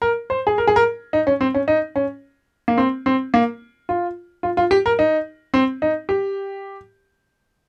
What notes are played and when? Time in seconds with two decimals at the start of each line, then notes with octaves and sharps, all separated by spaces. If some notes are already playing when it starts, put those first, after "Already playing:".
0.02 A#4
0.30 C5
0.47 G#4
0.58 A#4
0.67 G#4
0.76 A#4
1.13 D#4
1.27 C#4
1.41 C4
1.54 C#4
1.68 D#4
1.96 C#4
2.68 A#3
2.78 C4
3.06 C4
3.34 A#3
3.89 F4
4.43 F4
4.57 F4
4.71 G4
4.86 A#4
4.99 D#4
5.54 C4
5.82 D#4
6.09 G4